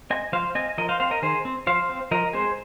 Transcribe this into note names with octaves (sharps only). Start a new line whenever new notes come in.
C4 D#5 G#5
F3 C5 F5
C4 D#5 G#5
F3 A#4 D#5
C5 F5
C4 C5 F5
A#4 D#5
D#3 G#4 C5
C4
F3 C5 F5
C4
F3 A#4 D#5
G#3 C4 G#4 C5